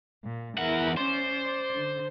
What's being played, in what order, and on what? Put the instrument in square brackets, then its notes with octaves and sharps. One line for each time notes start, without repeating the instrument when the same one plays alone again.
[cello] A#2
[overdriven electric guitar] E2 F#5 [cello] E4 A#4
[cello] C#4 D5 [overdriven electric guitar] C5
[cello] D5
D3